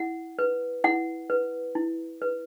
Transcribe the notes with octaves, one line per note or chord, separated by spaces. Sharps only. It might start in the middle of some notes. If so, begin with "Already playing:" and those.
Already playing: E4 F#5
B4
E4 F#5
B4
E4
B4